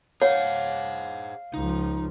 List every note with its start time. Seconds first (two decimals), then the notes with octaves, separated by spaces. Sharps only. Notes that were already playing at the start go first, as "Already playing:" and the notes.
0.22 G#4 C5 C#5 F5 F#5
1.54 C#2 F3 D#4